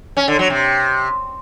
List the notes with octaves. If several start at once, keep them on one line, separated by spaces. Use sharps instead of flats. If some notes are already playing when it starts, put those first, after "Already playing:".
C#4
D3
F#3
C3